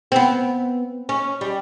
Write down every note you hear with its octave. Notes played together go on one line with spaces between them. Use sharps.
C4
B3
C#4
G3